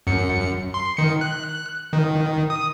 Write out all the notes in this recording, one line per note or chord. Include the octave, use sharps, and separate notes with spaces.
F#2 C#7
C6
D#3 C#7
F#6
D#3
D#6